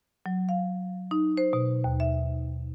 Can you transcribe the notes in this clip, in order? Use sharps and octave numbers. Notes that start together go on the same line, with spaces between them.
F#3
F5
D#4
C5
B2
D#2
E5